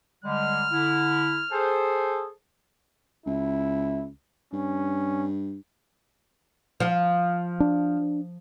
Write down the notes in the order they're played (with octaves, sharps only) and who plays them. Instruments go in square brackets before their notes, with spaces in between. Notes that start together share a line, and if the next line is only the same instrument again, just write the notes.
[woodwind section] D3 G3 G#3 [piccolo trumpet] F6
[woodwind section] D3 E4
G#4 A4 C5
[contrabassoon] C#2 [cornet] E4
[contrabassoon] G2 [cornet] C#4
[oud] F3
[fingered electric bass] D4